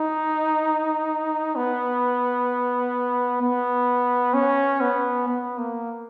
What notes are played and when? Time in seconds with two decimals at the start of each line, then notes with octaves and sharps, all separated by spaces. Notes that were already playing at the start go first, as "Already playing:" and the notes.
Already playing: D#4
1.56 B3
3.42 B3
4.34 C#4
4.81 B3
5.28 B3
5.58 A#3